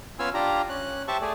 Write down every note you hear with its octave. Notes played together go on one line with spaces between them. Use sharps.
B3 C#4 F4 F5 G#5 E6
D4 F4 G4 D5 A#5
C#4 F#6
G4 C5 E5 A5 C#6
A3 G#4 D5